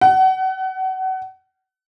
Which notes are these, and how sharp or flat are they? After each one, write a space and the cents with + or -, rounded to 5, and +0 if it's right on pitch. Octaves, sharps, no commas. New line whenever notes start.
F#5 +30